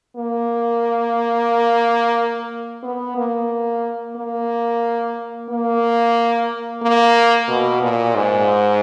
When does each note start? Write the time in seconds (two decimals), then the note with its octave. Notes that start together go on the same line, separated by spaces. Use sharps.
0.17 A#3
2.83 B3
3.17 A#3
4.16 A#3
5.50 A#3
6.83 A#3
7.49 B2
7.83 A#2
8.15 G#2